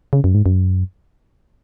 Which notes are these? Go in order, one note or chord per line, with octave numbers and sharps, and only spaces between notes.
C#3
F#2
G#2
F#2